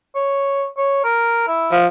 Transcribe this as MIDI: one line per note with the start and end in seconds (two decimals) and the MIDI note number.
0.15 0.67 73
0.77 1.00 73
1.04 1.47 70
1.48 1.73 64
1.72 1.87 53